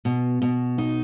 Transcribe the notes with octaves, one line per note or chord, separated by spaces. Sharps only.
B2
B2
D#4